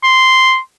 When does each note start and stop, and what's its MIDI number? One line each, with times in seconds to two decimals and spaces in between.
0.04 0.58 84